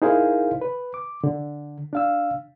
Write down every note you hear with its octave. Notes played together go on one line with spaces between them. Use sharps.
D#4 E4 G#4 A#4 C5 F5
B4
D6
D3
D4 F5 E6